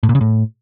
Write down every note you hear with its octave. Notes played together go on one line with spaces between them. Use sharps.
A2
A#2
C#3
A2